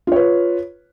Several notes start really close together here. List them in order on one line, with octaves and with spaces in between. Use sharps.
F4 C#5 B4